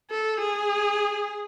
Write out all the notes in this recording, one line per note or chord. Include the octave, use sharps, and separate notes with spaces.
A4
G#4